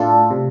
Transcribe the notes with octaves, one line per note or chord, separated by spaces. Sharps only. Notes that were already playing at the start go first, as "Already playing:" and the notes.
Already playing: A2 A3 D4 F4 A4
C3